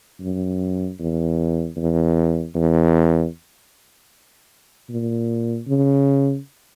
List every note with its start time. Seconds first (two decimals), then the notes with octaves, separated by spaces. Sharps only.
0.21 F#2
0.99 E2
1.77 E2
2.55 E2
4.89 A#2
5.67 C#3